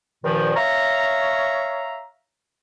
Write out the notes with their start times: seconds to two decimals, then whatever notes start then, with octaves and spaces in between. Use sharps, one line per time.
0.24 G2 A#2 D#3 F3
0.56 C#5 E5 F5 A#5